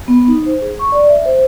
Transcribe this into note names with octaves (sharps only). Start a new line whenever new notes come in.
B3
D#4
C5
G#4
C#6
D5
E5
C5